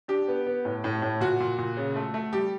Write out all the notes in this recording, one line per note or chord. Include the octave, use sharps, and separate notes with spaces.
D4 G4
B3
B3
A2
A2
A2
A#2 F#4
A#2
A#2
C#3
A3
A3
G3 G4